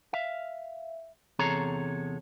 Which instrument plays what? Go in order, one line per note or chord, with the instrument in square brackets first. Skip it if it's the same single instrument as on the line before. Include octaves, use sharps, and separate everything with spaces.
[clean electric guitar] E5 F5
E2 C3 G#4 A4 C#5 A#5